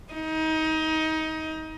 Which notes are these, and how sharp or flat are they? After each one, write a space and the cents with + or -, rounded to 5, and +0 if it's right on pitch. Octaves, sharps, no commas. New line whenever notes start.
D#4 +25